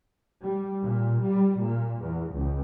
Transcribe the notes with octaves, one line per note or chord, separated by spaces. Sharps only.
G3
A#2
G3
A#2
E2
C#2